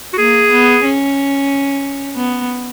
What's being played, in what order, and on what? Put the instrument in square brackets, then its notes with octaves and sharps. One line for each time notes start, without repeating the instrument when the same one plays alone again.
[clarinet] F#4
[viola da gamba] A#3 [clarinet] G#4
[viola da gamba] B3
C#4
B3